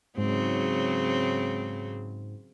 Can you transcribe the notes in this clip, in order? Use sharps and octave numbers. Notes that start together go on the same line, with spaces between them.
G#2 C#3 F#3 C4